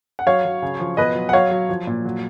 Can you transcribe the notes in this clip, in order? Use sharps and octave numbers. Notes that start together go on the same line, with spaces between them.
F#5
F#3 C#5 F5
F#3
C#3
F3
B2 B4 D#5
F#3
F#5
F#3 C#5 F5
F#3
F3
A#2
F#3